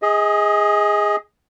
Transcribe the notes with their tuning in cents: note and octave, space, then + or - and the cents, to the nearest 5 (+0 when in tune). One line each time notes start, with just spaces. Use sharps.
G#4 -10 D#5 +25